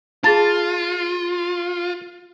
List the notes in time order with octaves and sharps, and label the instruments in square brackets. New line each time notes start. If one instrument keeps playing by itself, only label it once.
[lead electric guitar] F4 [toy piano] G#4 B5 [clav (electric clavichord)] A5